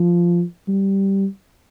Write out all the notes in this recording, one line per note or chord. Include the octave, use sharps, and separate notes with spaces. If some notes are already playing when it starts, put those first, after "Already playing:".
Already playing: F3
G3